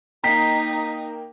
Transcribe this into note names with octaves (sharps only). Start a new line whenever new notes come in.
A#3 D#4 A#4 D#5 G5 A#5 B6 C7